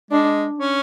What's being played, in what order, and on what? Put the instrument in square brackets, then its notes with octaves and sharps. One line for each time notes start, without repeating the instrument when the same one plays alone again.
[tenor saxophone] G#3 [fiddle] D4
[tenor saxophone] C#4